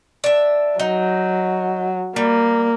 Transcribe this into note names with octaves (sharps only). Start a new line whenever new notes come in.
D4 E5
F#3 D#4
G3 A#3